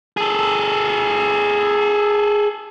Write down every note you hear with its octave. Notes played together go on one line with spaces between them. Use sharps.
G#4 A4